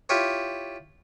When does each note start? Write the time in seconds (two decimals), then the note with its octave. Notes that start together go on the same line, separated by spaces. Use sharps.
0.09 E4 F4 G4 C#5